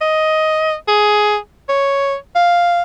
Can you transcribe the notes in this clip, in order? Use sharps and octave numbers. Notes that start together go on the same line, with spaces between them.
D#5
G#4
C#5
F5